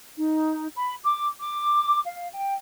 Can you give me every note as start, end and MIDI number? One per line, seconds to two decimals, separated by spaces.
0.17 0.67 63
0.75 0.93 83
1.02 1.26 86
1.39 1.99 86
2.04 2.27 77
2.31 2.53 79